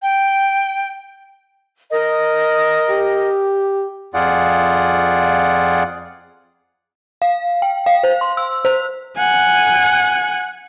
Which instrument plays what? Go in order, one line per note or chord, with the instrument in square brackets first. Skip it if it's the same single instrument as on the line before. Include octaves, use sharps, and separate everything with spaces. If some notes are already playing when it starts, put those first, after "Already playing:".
[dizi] G5
[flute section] A#4 D#5
[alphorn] G4
[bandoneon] F2 F4 G#4 D5 F#5
[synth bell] F5
G5
F5
C5
C6
E6
C5
[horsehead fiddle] F#5 G#5